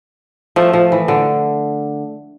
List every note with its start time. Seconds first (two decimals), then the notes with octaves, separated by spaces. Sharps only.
0.56 F3 A3
0.73 F3
0.92 E3
1.08 D3